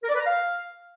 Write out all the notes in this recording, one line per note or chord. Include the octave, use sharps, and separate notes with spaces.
A#4
D5
B4
A#5
F5